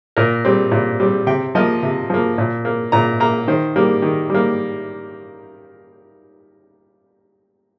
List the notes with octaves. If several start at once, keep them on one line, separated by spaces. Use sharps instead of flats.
A#2 A#4
G3 C4
A#2
G3 C4
C3 G5
F3 A#3 D#5
C3
F3 A#3
A#2
A#3
A#2 A#5
A#3 A#5
D#3 C5
G3 A#3
D#3
G3 A#3